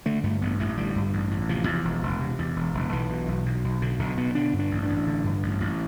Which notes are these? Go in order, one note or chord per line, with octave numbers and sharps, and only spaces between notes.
D3 A3
G2 A3
A1 B3
A1 A3
D3 G3
G2
A1
A1
C3 F3
E2
E1
E1
C3
E2
E1
E1
B1 E3
B2
B1
B2
B1
B2 D3
B1 D3
B2 B3
D3 D4
G2
D4
A1
D4
A1
D3
G2
A1
A1